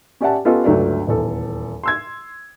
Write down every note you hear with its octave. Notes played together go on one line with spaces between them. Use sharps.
C#4 G4 D5 E5 F#5 A5
B3 C#4 F4 G4 A4 D#5
G1 C#2 F#3 A3 D5
D#1 E2 A4
C6 E6 G#6